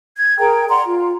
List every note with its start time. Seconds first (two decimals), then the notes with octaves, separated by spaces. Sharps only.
0.17 G#6
0.39 G#4 A#4 G5 A#5
0.69 D5 F#5 A#5 C6
0.86 F4